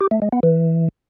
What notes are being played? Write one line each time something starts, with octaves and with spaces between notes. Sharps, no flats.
G4
A3
G#3
B3
E3